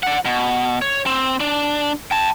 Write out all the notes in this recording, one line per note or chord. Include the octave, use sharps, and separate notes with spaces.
D5 F#5
B2
C#5
C4
D4
G5 A5